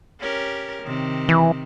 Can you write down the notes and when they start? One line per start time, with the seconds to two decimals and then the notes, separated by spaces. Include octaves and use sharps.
0.20 C#4 G4 A#4
0.83 C3 D#3
1.29 E3